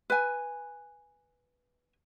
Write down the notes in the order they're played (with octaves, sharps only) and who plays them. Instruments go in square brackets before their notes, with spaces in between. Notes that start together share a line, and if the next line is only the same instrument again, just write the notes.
[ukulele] B4 G#5